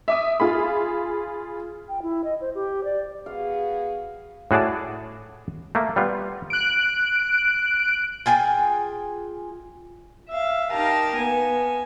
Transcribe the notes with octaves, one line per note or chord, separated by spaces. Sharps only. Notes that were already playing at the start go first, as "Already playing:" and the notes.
E5 D6 D#6
F4 G#4 B5
G5
E4
D#5
C5
G4
D5
B3 F#4 G#4 F5
A2 F#4 G#4 D5 A5
A3 A#3
G3 B3 F4
F#6 D7
F4 G#4 G5 G#5
E5 F5
D#4 G4 A#4 F5 A5 A#5
B3 G#5